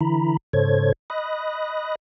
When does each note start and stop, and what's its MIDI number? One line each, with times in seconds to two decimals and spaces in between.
0.01 0.37 50
0.01 0.37 52
0.01 0.37 64
0.01 0.37 82
0.01 0.37 83
0.53 0.92 44
0.53 0.92 49
0.53 0.92 69
0.53 0.92 72
0.53 0.92 73
0.53 0.92 92
1.10 1.95 75
1.10 1.95 83
1.10 1.95 87
1.10 1.95 90
1.10 1.95 94